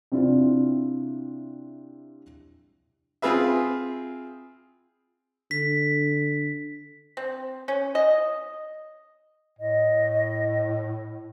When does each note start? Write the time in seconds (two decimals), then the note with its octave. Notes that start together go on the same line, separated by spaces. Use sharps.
0.12 C3 C4 D4 E4 F4
3.22 C4 F4 G#4 B4 E5
5.51 D3 B6
7.17 C4
7.68 C#4
7.95 D#5
9.59 A2 D#5